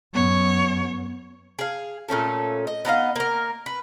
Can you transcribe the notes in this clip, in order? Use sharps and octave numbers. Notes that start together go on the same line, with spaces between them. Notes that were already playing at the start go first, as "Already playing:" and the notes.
F#2 B3 C#5
G#4 F5
A#2 A3 C#4 A4
D#5
B3 D#4 D#5 F5
A#3 A#4
B4